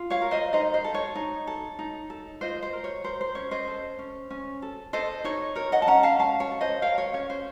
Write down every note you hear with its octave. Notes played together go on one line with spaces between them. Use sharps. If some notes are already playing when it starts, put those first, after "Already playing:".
Already playing: F4
C#5 F5
A#4
C5 D#5
D#4 C5 D#5
C5
A4
C#5
D#4
A4
D#4
A4
F4 C5 D#5
C5
A#4
C#5
A#4 C5
C5
C#4 C#5
C5 D#5
A4
C#4
C#4
A4
A4 C5 D#5
D#4 C#5
A#4 C#5
D#5 F#5
A5
C#4 F#5 A#5
F5 A5
C#4 F5 A5
C#5
A4
C5 D#5
A#4 C#5 F5
C#5
C#4 C#5
C5